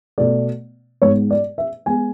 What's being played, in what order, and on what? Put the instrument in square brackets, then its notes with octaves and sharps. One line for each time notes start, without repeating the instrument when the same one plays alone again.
[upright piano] B2 A3 D5
G#2 G#3 B3 C#5
D5
E5
G#3 B3 G#5